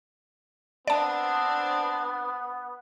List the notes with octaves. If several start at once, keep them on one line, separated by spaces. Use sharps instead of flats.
B3 C4 D4 D5 A5